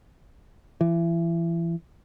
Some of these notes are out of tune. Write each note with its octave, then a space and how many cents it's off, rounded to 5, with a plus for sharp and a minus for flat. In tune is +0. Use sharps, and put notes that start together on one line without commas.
E3 +30